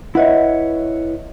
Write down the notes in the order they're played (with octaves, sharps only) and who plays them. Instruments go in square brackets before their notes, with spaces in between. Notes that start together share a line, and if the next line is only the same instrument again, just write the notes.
[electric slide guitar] E4 B4 C#5 [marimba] D#5 E5 F#5